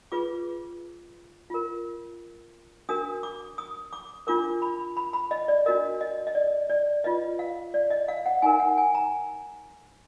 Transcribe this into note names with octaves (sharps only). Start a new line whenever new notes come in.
F4 G#4 B4 D6
F4 A#4
D4 F#4 A#4 D#6
D6
D#6
D6
D4 F4 A#4 D6
B5
B5
B5
D#5
D5
D4 F#4 A#4 D#5
D#5
D#5
D5
D5
F4 B4 D#5
F5
D5
D#5
F5
F#5
D#4 A#4 G#5
F#5
G#5
A#5